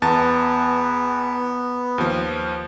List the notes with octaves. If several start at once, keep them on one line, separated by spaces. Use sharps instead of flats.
E2 B3 A5 A6
D#2 F3